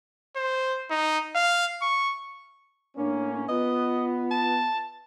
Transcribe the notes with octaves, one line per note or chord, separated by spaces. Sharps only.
C5
D#4
F5
C#6
A2 A#3 C#4 D4
B3 F4 D#5
A5